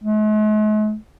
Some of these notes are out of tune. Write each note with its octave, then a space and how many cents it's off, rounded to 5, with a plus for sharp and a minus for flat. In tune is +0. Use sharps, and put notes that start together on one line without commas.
G#3 +45